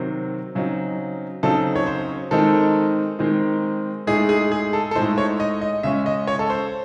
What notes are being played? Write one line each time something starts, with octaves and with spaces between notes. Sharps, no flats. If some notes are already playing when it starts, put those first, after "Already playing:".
Already playing: C3 D#3 F#3 C4
C#3 F#3 C4 D#4
C#3 F#3 C4 D#4 A4
C#5
C5
D#3 G#3 C4 D#4 A4
D#3 G#3 C4 D#4
A2 G#3 D#4 G#4
G#4
G#4
A4
A4
A2 G#3 D#4 C5
C#5
D#5
D#5
C#3 G#3 C#4 E5
D#5
C#5
A4
C5